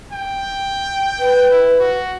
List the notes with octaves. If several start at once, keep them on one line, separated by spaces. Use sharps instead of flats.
G5
B4
E4
F#4